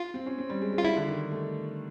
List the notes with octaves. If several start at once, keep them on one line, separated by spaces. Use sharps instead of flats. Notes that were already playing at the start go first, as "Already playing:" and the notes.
Already playing: F4
C4
C#4
C4
G3
G#3
G#3
F4
G3 E4
D3
D#3
A3